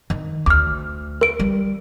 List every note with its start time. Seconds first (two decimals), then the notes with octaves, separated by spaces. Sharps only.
0.10 D#3
0.46 D2 D6 F6
1.21 A#4 D7
1.39 G3